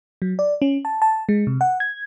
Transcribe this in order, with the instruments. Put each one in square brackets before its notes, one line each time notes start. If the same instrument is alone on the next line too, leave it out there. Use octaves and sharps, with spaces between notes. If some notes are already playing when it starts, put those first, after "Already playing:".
[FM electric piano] F#3
D5
C#4
A5
A5
G#3
C3
F#5
G#6